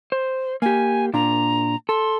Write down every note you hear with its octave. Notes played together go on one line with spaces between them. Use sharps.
C5
A#3 G4 G#5
A#2 D4 A#5
A4 C6